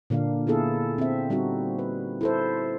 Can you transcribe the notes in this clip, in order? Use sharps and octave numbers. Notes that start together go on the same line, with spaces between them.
A#2 D3 A#3 D4 F5
B3 E4 G#4 A4 F5
C4 E5
G3 C4 D#4 F#4
B4
E4 A4 C5